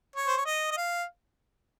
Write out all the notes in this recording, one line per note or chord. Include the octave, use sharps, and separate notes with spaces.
C#5
C5
C#5
D#5
D#5
F5